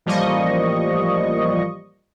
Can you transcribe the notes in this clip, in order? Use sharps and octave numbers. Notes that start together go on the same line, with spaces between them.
A1 F3 G3 A#3 D#5 C#6